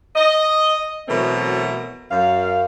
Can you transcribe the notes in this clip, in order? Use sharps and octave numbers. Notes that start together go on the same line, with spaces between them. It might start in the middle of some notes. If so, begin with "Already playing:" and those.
D#5
B2 E3 F#3 A3 C4 A#4
F#2 F5